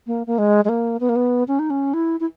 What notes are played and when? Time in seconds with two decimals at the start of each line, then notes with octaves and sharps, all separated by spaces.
0.07 A#3
0.27 A#3
0.38 G#3
0.65 G#3
0.69 A#3
1.00 B3
1.09 A#3
1.16 B3
1.48 C#4
1.59 D#4
1.70 C#4
1.94 E4
2.20 E4